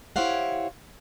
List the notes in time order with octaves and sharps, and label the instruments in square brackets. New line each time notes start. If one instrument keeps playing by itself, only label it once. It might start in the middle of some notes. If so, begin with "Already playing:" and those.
[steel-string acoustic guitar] E4 G4 C5 C#5 F5 F#5